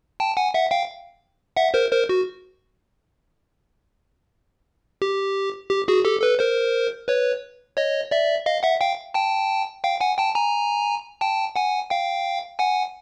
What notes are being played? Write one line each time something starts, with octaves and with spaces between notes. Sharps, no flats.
G5 A5
F#5 G#5
E5 F#5
F5 G5
E5 F#5
A#4 C5
A#4 C5
F#4
G4
G4
F#4 G#4
G4 A4
A4 B4
A#4 C5
B4 C#5
C#5 D#5
D5 E5
D#5 F5
E5 F#5
F5 G5
G5 A5
F5 G5
F#5 G#5
G5 A5
G#5 A#5
G5 A5
F#5 G#5
F5 G5
F#5 G#5